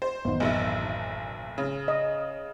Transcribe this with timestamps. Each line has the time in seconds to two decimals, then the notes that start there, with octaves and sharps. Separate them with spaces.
0.02 C5
0.25 A1 F#2 D#3 B3 D#4
0.40 F#1 B1 D#5 E5
1.58 C#3
1.88 D#5